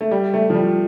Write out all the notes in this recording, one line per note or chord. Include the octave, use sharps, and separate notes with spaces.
A3
G3
A3
F3
G3